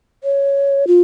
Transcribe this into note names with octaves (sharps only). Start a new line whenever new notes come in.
C#5
F4